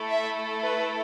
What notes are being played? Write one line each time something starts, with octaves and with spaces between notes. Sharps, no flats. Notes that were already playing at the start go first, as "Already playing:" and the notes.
Already playing: A3 E4 A4
E5
B4